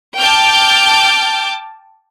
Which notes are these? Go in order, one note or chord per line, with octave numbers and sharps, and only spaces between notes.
G5 A5 D6 F6 G6